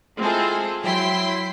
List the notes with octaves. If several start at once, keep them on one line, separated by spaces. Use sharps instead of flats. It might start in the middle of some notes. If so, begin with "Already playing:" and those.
G#3 C4 E4 F4 G#4 A4
F#3 E4 G5 C6 B6